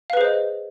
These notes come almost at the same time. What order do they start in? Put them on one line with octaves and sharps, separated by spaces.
F5 B4 G#4 C5 D#5